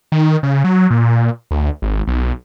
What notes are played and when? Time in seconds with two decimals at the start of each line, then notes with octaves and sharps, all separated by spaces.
0.12 D#3
0.43 C#3
0.64 F#3
0.90 A#2
1.51 D2
1.82 G#1
2.07 B1